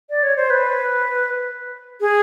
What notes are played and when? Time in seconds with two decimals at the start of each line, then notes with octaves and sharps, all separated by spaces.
0.10 D5
0.23 C#5
0.36 C5
0.50 B4
2.01 G#4